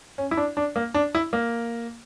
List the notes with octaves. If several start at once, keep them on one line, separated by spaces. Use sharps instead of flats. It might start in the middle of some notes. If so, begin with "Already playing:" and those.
C#4
E4
D4
D4
A#3
D4
E4
A#3